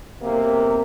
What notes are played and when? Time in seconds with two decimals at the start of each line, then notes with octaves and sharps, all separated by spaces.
0.21 B1 C3 A#3